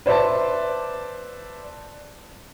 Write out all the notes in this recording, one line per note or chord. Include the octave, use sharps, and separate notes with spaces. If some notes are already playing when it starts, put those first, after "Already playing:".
B4 C5 D5 E5 A5